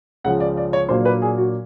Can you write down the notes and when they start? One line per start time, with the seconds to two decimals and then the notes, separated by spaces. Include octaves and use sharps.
0.24 C#2 C#3 F3 F#5
0.40 D5
0.57 D5
0.73 C#5
0.89 A#2 F#3 A#3 D4 C5
1.05 B4
1.22 G#4
1.38 F#4